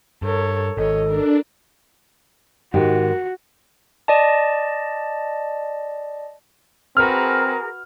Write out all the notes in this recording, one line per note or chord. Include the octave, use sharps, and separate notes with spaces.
G2 A4 A#4 C#5
G#1 A4 C#5 D#5
D4 A#4
G#2 D#3 F#4 G4
D5 D#5 A5
C4 F#4 G#4 A#4 B4 F6